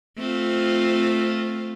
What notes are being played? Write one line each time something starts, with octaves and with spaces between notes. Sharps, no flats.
A3 C4 F4